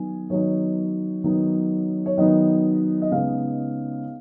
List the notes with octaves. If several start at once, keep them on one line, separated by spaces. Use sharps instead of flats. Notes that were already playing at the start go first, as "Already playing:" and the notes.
Already playing: D#3 F#3 B3 D#4 G#5
D#3 F#3 B3 D#4 C#5
D#3 F#3 B3 D#4
C#5
D#3 F#3 B3 D#4 D#5
D#5
C#3 G#3 B3 D#4 F5